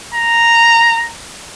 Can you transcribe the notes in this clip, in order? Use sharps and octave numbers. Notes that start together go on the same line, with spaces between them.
A#5